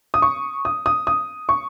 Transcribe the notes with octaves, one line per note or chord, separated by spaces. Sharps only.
D#6
C#6
D#6
D#6
D#6
C#6